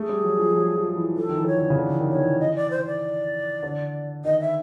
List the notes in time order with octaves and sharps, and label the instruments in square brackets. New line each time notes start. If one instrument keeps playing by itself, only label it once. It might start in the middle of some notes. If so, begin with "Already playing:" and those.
Already playing: [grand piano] A3 [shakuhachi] G#4
[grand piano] G3
F#3
F3
F#3
F3
E3
[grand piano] F3 [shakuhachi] A4
[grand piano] D#3
E3
[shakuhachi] C#5
[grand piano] D3
C#3
D3
E3
D#3
[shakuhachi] C#5
[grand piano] D#3
E3
[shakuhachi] D#5
D5
C5
D5
[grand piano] D3
[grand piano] D#3 [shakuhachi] D#5
[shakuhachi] E5